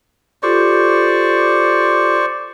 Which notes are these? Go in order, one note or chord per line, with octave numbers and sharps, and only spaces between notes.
F4 G4 A4 C5 D5 C#6